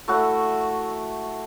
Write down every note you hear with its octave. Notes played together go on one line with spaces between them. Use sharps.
A3 E4 F#4 F#5